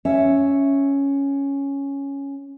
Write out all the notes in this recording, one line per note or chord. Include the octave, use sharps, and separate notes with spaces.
C#4 E5